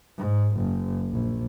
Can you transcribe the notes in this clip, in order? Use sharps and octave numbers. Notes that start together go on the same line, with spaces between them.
G#2
F#1
A#1